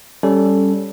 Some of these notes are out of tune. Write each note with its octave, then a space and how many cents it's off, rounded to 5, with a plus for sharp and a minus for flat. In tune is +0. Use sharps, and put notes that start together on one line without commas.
G3 +0 C#4 +0 A4 +0